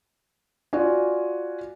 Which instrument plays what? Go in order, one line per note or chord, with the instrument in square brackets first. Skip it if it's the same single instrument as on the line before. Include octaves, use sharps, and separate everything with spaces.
[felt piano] F4 F#4 D5 G#5